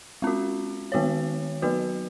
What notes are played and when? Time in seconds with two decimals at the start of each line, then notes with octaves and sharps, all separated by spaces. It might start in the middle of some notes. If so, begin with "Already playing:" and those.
0.22 G#3 C#4 F#4
0.92 D#3 G#3 B3 F#4 C#5
1.62 F#3 B3 F#4 B4